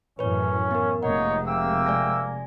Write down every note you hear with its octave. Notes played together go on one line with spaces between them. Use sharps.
F#2 A2 E3 C#4 B4 C#5
B3 A#4
F1 C3 G#3 A#3 D#4 C#5 F#5
A#3 E5 G5 E6
D5 G#5 A#6